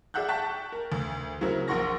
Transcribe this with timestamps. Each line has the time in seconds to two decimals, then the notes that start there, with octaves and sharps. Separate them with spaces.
0.14 G#4 D5 E5 F#5 F#6 G6
0.28 G5 A5 C#6 F#6 A6 B6
0.72 A#4
0.92 D2
1.41 C#3 F#3 C4 E4 A#4
1.68 A#1 A#4 F#5 C6 C#6 A#6